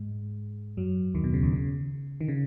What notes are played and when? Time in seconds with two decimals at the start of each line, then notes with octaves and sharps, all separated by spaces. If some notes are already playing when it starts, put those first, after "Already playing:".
Already playing: G#2 G#3
0.77 F#2 F#3
1.14 D#2 D#3
1.24 B2
1.34 C#3
1.43 D#2 D#3
1.53 C#3
2.21 D#3
2.28 C#3